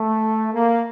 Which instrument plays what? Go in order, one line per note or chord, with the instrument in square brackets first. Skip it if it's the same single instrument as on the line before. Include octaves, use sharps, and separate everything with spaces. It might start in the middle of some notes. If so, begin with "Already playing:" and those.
Already playing: [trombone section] A3
A#3